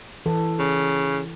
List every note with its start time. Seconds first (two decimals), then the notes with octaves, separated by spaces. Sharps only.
0.26 E3 A4
0.59 C#3